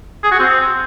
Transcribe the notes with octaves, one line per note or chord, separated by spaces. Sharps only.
G#4
F#4
C4